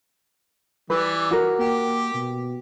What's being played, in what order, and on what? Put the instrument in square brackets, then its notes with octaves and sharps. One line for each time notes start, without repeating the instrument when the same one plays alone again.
[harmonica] E3 G3 [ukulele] B4
[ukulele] F#4 A#4
[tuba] A#3 [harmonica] G4
[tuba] B2